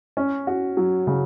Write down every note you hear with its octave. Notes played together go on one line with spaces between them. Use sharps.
C#4
F#4
F#3
C#3